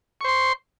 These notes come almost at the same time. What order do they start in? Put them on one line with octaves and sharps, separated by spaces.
C#6 C5 C6